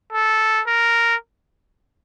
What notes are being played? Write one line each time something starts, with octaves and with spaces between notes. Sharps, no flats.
A4
A#4